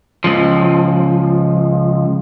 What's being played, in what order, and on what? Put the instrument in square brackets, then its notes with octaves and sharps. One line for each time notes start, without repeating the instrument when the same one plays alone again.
[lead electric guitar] C#2 F3